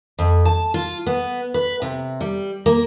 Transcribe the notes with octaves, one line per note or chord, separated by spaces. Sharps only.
F2
A5
F4
B3
B4
C3
G3
A#3